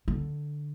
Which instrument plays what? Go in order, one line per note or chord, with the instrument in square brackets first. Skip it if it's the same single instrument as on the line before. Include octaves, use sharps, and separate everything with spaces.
[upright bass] D3